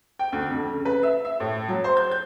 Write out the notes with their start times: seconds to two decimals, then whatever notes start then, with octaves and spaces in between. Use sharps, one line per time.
0.19 G5
0.32 D2
0.50 F2
0.73 C#3
0.85 B4
1.03 E5
1.25 E5
1.40 A2
1.69 F#3
1.84 C5
1.97 G6
2.11 G6